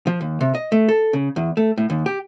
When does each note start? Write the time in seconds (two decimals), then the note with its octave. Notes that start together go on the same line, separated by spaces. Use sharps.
0.07 F3
0.21 D#2
0.41 C3
0.55 D#5
0.72 A3
0.89 A4
1.13 C#3
1.36 E2
1.57 A3
1.78 A2
1.90 D#2
2.06 G4